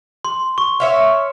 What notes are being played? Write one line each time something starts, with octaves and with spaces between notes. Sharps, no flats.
C6
C#6
C#5 E5 F5